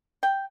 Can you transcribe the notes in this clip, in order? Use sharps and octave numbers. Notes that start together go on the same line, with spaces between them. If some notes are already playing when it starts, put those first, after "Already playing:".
G5